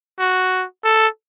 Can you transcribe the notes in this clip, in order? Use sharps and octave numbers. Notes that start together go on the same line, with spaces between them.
F#4
A4